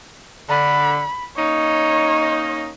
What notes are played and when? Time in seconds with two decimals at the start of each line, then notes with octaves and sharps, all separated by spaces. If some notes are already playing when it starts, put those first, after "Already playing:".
0.49 D3 B5
1.38 A#3 C#4 D#4 C#5